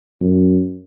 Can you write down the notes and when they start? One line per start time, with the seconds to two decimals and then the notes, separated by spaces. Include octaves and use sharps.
0.21 F#2